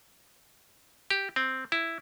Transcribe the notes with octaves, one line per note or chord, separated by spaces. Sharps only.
G4
C4
E4